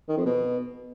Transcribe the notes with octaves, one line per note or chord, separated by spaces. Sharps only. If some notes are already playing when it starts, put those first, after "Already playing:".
D#3
F2
B2